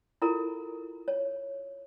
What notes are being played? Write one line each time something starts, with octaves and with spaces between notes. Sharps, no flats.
E4 F4 A4 A#4 A#5
C#5